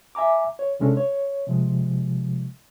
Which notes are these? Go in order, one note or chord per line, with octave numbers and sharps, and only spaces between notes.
E5 G#5 A#5 D6
C#5
C2 C3 G#3 C#4 D4 A4
C#5
C3 F3 G#3